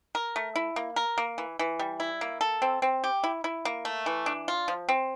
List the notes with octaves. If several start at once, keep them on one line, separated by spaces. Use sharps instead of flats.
A#4
A3
E4
A#3
A#4
A#3
E3
E3
G3
E4
A#3
A4
C4
C4
G4
E4
E4
A#3
A3
E3
D4
F4
F3
C4